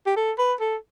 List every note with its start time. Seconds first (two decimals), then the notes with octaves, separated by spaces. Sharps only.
0.06 G4
0.16 A4
0.38 B4
0.60 A4